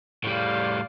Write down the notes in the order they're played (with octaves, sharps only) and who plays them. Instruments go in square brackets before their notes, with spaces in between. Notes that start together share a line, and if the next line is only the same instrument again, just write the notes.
[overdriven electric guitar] A2 G3 [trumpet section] D5 F5